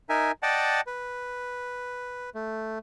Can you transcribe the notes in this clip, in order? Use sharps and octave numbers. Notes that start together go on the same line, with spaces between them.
D#4 A#4 E5 G#5
D5 D#5 F#5 G5 A5
B4
A3